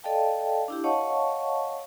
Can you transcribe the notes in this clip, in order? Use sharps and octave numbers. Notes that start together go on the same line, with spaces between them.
A4 D5 D#5 F5 G5 A5
D4 E4 G4
C#5 D#5 F5 F#5 A5 C#6